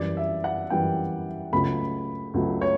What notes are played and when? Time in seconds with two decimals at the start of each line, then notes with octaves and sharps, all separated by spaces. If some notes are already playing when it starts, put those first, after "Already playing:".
Already playing: F#2 E3 G3 D5
0.17 E5
0.44 F#5
0.70 F#2 E3 G3 G5
1.52 C#2 C#3 F#3 A3 B5
2.34 C#2 C#3 F#3 A3
2.61 C#5